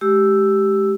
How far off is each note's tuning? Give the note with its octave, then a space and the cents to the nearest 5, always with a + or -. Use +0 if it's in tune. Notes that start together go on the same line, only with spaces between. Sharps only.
G#3 +25 G4 -10 E6 +0